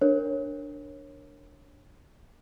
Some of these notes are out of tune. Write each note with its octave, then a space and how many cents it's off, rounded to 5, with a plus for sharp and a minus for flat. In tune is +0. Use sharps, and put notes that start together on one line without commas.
D4 +0 A#4 +0 C#5 -20